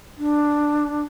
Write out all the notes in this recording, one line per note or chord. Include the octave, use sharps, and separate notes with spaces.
D4